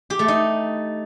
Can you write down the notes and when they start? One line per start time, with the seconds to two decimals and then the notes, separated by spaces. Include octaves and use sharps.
0.10 G4
0.19 A3
0.28 D#4